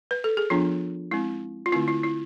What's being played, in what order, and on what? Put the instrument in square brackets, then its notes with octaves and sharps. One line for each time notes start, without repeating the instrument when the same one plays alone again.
[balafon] B4
A4
G#4
F3 B3 D4 F4
G#3 C4 E4
F4
D3 A3 C4 E4
E4
E4